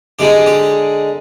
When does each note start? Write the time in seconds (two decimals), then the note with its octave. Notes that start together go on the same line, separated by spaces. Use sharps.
0.19 D3 G#3 D#4 G4
0.46 G4